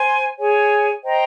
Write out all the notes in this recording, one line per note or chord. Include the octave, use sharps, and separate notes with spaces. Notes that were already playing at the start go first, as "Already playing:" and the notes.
Already playing: C5 G#5
G#4 C#5 G#5
C5 D#5 G5 A#5